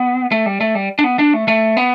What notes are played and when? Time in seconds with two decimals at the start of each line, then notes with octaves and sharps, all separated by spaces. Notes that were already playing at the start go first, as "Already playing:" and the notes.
Already playing: B3
0.32 A3
0.46 G3
0.61 A3
0.75 G3
0.99 D4
1.04 B3
1.19 D4
1.34 A3
1.48 A3
1.77 B3